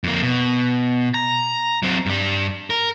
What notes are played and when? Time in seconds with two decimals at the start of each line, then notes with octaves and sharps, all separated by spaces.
0.04 F2 A#3
0.22 B2
1.14 A#5
1.83 F#3 C4
2.06 G2 G3
2.70 A#4